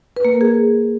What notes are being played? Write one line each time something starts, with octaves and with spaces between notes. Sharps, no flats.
B4
A#3
A#4
G#4